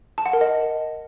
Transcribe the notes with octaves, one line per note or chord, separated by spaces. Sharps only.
A5
F#5
A#4
D#5